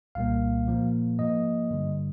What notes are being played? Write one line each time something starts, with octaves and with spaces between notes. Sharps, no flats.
C2 A#2 G3 A#3 F5
A#2 F3 A#3
G#2 F3 A#3 D#5
G2 D3 G3